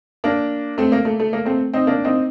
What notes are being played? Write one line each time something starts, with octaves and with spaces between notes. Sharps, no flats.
A#3 D4
A3 C4
A#3
A3
A3
A#3
A3 C4
C4 D#4
A#3 D4
C4 D#4